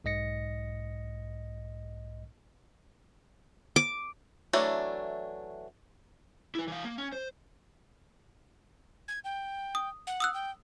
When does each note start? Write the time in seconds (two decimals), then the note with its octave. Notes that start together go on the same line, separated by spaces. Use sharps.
0.04 B1 G#2 D#5 A#6 C#7
3.76 D6
4.53 E3 F#3 A3 D4
6.55 E4 B4
6.68 E3 F5
6.84 A#3
6.98 C#4
7.12 C5
9.08 G#6
9.24 G5
9.75 D#6
10.07 F#5
10.20 D#6 E6 F#6
10.34 G5